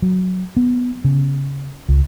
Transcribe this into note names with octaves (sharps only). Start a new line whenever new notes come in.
F#3
B3
C#3
C#2